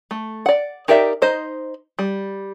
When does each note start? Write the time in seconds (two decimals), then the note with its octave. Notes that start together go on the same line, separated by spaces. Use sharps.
0.11 A3
0.46 D5 F#5
0.88 D#4 G4 A#4 D5 E5
1.22 D#4 C5 D#5
1.99 G3